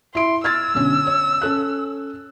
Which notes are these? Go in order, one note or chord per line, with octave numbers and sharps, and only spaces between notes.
E4 C6 D7
E6 F6 G#6 A6
B1 D3 C#4
C#5
C#4 A4 F#6